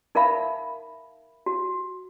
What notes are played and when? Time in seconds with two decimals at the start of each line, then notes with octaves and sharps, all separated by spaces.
0.15 D#4 A#4 E5 F5 B5
1.46 F#4